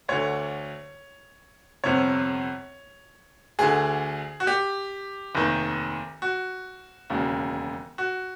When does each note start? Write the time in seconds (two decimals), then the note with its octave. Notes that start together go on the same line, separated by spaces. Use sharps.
0.09 D2 D3 C#5
1.84 G1 F2 C3 C#5
3.59 D2 D3 G#4
4.40 F#4
4.47 G4
5.35 F1 D#2 D#3
6.22 F#4
7.10 E1 D#2 C#3
7.98 F#4